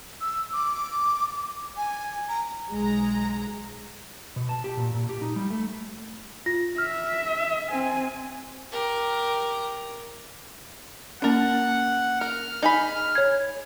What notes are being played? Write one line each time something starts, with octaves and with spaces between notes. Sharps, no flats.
E6
D6
G#5
A#5
B1 G#3 A#5
B2
A5
G4
A#2
A#2
G4
D#4
G3
A3
F4 A#6
E5 F6
C4 G#5
G4 A#4
A#3 C#4 D4 A#4 F#5
A#4 F6
D#4 G#4 B5
C#5 G#6